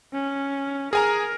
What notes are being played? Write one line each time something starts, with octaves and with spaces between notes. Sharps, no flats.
C#4
G#4 A#4 G#5 A#5